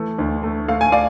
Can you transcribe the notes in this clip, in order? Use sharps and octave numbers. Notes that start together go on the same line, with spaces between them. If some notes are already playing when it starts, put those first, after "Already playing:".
Already playing: E3 A3
D2
A3
A3 F5
G#5
D5 F5